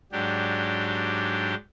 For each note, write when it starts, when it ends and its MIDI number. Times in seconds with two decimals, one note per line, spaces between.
0.12 1.54 44
0.12 1.54 54
0.12 1.54 62
0.12 1.54 67